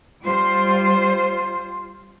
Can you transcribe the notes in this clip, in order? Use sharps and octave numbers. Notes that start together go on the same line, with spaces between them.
G3 F4 C5